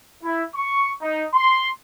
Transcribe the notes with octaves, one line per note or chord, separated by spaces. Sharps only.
E4
C#6
D#4
C6